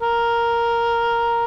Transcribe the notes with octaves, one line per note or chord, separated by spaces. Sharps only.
A#4